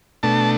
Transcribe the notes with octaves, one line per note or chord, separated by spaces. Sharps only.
B2 A3 D4 A5